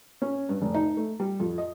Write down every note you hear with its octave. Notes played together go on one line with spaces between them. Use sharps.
C#4
G2
F1
D#4
A3
G3
F2
D#5